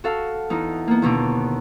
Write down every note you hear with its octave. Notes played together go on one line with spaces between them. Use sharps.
F#4 A4 F5
E2 D#4
A#3 B3
D#2 B2 D3 D6